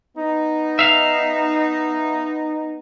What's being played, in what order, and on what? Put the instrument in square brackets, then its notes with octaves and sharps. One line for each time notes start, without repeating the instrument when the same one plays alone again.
[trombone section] B3 D#4
[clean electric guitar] E5 F5